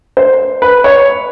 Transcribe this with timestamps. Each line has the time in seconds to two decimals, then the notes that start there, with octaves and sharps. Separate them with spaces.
0.17 C5
0.62 B4
0.84 C#5